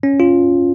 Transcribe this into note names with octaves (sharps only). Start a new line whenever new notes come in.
C#4
F4